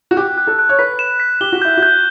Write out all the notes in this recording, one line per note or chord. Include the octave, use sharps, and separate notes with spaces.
F#4
G4 F#6
F#6
A4
F#6
C#5
B4 B6
E7
B6
G4 G7
F#4
E4 G6
F#4
G6